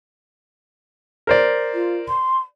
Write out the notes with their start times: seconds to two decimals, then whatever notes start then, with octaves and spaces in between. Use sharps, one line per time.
1.27 A#4 C5 D5
1.74 F4
2.08 C6